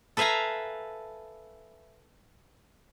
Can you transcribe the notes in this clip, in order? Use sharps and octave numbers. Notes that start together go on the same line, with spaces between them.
A4 B4 E5 F5 G#5 A#5